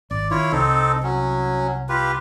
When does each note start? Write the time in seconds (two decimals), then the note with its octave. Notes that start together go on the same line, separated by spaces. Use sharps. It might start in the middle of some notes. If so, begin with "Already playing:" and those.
0.11 G#1 D5
0.31 D#3 E4 F4 C#5
0.52 C2 C4 D#4 A4
1.03 F#3 C#4
1.89 F4 G4 B4